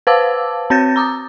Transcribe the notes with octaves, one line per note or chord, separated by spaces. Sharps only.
B4 C5 F5 A5 D6 E6
C4 C#5 G6 A6 A#6
A#5 D6 D#6